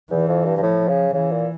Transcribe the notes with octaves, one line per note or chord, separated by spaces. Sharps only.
E2 E3
F2
G2
G2
A2 F3
C#3
C#3 E3
A#2